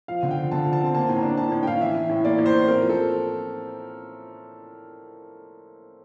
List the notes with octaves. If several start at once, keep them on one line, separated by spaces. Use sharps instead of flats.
F3 F5
D3
G5
F3
D3 A5
F3
A5
C4
A#3 A5
A2
A#5
D4
A2 A5
A2
G5
A2 F5
E3 E5
E3
A2
A#3 D5
A2
C5
A2
C4 A#4
F3
A4